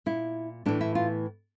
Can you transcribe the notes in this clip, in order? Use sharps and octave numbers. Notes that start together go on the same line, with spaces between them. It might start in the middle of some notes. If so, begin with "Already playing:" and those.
A#2 E4
A2 E3 D4
E4
F4